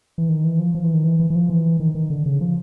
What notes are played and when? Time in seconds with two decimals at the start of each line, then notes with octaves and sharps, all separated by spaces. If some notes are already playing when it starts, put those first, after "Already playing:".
0.18 E3
0.29 D#3
0.44 E3
0.59 F3
0.75 F3
0.84 E3
0.94 D#3
1.04 E3
1.20 E3
1.30 E3
1.35 F3
1.50 E3
1.80 D#3
1.95 D#3
2.10 D3
2.26 C#3
2.41 F3